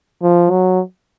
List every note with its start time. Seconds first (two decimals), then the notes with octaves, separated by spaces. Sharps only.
0.22 F3
0.50 F#3